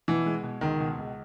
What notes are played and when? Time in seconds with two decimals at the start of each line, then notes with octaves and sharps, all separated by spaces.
0.08 B2 E3
0.26 G#3
0.43 B2
0.61 C#2 D#3
0.80 B2
0.98 C#2